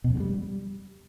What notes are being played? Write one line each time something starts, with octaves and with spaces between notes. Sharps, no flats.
B2
F2
C#3
G3